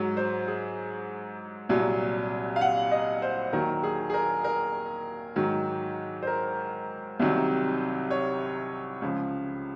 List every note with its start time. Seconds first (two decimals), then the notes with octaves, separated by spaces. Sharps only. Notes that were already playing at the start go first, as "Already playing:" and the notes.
Already playing: G#2 F#3
0.17 C5
0.47 G#4
1.69 C2 A#2 F#3
2.56 F5
2.61 F#5
2.91 D#5
3.22 C5
3.53 D#2 D#3 F#3 A#4
3.83 G#4
4.10 G#4
4.14 A#4
4.44 A#4
5.36 G#2 D#3 F#3
6.23 C5
6.27 A#4
7.20 C2 C3 D#3 F#3
8.11 C#5
9.02 C#2 C#3 F3